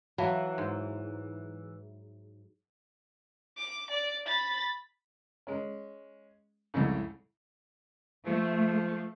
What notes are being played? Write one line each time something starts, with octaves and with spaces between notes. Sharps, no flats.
E3 F#3 F5 A5 B5
G#2
D6
D5
B5 A6
G#3 C#4
C2 F2 A2 C#3
F3 A3